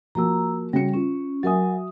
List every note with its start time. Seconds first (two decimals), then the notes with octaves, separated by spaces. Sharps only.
0.15 F3 A#3 F#4 A#5 E6
0.73 C#3 G3 F#4 C#7
0.94 C#4 F4
1.43 F#3 F#4 A#4 E5 G#5 D#6